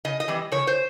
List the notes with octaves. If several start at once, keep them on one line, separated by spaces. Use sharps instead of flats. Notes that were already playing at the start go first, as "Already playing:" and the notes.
C#3 D#5
D#5
E3 G3 C4
C#3 C#5
C5